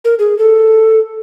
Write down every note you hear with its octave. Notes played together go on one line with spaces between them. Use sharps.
A#4
G#4
A4